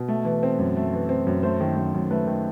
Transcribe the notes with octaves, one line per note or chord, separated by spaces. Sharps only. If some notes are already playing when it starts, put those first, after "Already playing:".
Already playing: B2
A3
E3
C4
F#2
A3
E3
C4
F#2
A3 C5
D#3
F#2
F#2
A3 B4
D#3